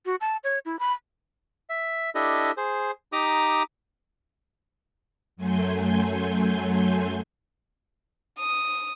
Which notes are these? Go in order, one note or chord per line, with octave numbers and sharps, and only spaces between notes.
F#4
A5
C#5
E4
B5
E5
D4 E4 G4 A4 D#5
G#4 C5
D#4 G4 A#5 D6 D#6
F#2 F#3 A3 G#5 C6 G6
D#6